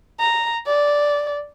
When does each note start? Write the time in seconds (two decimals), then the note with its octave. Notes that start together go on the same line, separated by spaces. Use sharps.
0.20 A#5
0.66 D5